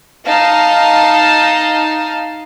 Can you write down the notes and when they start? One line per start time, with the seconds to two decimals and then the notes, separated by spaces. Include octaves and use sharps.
0.25 D#4 F5 A5